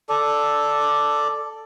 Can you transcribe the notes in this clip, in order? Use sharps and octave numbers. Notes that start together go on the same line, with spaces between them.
A4 D5